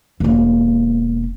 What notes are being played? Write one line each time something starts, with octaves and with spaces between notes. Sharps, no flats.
E1 A#3